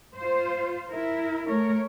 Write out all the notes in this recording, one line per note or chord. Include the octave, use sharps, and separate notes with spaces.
F4 C5
E4 A#4
A3 A#4 C#5